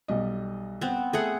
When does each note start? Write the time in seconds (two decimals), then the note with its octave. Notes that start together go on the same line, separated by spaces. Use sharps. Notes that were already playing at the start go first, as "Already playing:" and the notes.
0.08 B1 G3 D#5
0.81 B3 C4
1.13 A3 G#4 A4 F#5